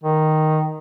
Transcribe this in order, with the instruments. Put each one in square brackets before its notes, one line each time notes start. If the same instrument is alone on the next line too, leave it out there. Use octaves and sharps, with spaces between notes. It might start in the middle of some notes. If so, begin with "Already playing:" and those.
[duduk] D#3